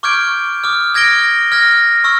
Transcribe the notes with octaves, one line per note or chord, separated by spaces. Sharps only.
C#6 D6 F6 G6 G#6 D7
D6 D#6 F6
F6 G#6 A#6 D7 G7
F6 G#6 A#6
C#6 E6 F6